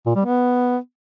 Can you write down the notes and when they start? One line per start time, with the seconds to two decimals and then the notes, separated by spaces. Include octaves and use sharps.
0.06 A#2
0.15 G3
0.25 B3